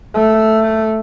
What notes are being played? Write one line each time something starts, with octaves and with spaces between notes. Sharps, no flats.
A3